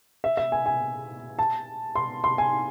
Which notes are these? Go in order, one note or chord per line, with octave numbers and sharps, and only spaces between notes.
E5
E5
G#5
G#5
A5
C6
C6
G#5